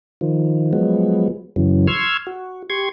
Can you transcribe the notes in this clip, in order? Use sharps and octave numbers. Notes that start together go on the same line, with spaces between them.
D#3 F3
F3 F#3 G#3 B3
F#2 C#3 E3 F#3
C6 C#6 E6 F6 G#6
F#4
G4 C6 C#6 G#6